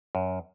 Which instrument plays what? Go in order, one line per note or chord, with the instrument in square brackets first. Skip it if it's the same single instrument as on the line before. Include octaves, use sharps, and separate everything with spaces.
[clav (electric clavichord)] F#2